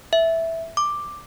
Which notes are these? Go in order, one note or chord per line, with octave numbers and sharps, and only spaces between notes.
E5
D6